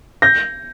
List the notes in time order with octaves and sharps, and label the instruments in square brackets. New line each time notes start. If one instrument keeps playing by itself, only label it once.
[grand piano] G6 A#6